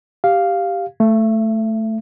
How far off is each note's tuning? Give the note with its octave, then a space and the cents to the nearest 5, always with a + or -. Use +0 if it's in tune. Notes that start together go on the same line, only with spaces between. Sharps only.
G4 +0 F5 +0
A3 +0 E5 +30